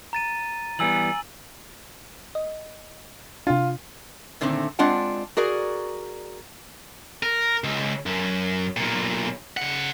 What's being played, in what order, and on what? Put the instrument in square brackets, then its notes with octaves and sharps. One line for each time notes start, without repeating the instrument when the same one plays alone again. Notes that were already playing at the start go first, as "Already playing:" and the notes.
[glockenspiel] A#5 A6 D#7
[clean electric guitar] E3 G3 B3 [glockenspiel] G#5 E6 F#7
[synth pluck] D#5
[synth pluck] C3 D4 [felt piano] F4
[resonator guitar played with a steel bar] A#2 D3 D#3 A3 C4
G#3 C4 D4 F4 F#5
F#4 G#4 A#4 D5
[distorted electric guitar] A#4
C#2
F#2
B1 A#2
C#3 F#5